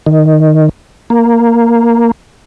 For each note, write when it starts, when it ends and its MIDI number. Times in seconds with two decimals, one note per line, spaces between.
0.06 0.69 51
1.10 2.11 58